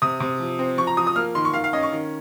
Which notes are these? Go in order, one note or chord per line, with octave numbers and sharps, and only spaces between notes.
C3 D#6
C3
F3
C4
F3 C#6
A#5
F3 D#6
D#6
A#3 F6
D#3 C6
C#6
D#3 F5
F5
C#4 D#5
C#6
D#3